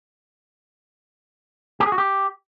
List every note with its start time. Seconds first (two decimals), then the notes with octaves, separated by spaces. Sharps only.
1.80 G4
1.86 G#4
1.92 F#4
1.98 G4